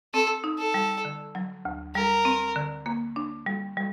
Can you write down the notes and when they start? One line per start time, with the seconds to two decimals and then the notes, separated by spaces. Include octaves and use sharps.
0.14 C4 A4
0.44 D#4
0.58 A4
0.74 G3
1.05 D3
1.35 F#3
1.65 D2
1.95 G3 A#4
2.25 C4
2.56 D3
2.86 A#3
3.16 D4
3.46 G3
3.77 G3